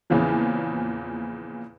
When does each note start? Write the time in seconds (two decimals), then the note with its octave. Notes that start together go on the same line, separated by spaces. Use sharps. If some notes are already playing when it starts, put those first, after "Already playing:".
0.10 E2 A#2 C#3 E3 F3